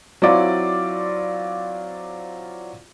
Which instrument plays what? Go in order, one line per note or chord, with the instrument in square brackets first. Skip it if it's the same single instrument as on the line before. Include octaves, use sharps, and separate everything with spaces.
[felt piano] F#3 C4 E4 F4 D5